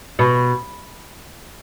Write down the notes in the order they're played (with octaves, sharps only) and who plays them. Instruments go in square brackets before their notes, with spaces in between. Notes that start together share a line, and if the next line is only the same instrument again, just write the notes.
[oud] B2